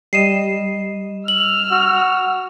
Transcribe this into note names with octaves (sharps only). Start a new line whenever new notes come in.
G3 D#5 C7 D#7 E7
E6 F6 F#7
F#4